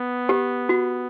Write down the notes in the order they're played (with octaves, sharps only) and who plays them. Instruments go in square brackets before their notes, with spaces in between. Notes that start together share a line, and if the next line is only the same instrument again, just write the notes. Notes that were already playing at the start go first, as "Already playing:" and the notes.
Already playing: [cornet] B3
[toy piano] G4
F#4